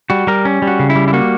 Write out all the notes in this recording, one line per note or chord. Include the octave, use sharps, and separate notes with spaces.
G3 F#4
G3 A#4
C#4
G3
F#4
C#3
E4
G3
E4
A#3 F#4